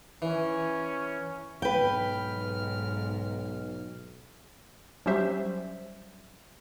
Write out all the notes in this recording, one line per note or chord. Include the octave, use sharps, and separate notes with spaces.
E3 C#4
B1 G#2 B4 G5 F6
F#3 G3 C#4 G4 C5 E5